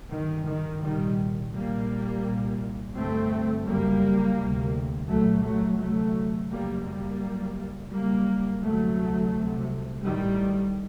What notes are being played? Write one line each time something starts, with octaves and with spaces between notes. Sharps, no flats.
G1 G2 D#3
D#3
C2 A#2 D#3 G3
A#1 A#2 G3 A#3
C2 A#2
G1 G2 A3 C4
F#1 F#2 G3 A#3
D2 C3
C2 A#2 F#3 A3
F#3 A3
D2 C3 F#3 A3
F#1 F#2 G3 A#3
G3 A#3
F#1 F#2
F#1 F#2 G3 A#3
D2 C3 F#3 A3
C2 C3
A1 A2 D#3 G3